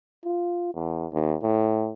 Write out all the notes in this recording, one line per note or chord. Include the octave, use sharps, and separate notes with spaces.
F4
E2
D#2
A2